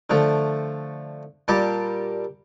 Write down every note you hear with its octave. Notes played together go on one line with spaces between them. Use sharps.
D3 F3 A3
A#2 G3 G4 A5 D6